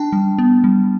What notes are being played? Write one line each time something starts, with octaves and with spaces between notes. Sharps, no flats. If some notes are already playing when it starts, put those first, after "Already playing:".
Already playing: D4 G5 A5
G3
B3
G3